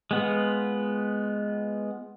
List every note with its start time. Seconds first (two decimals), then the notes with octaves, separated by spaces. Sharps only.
0.11 G#3 B3 F4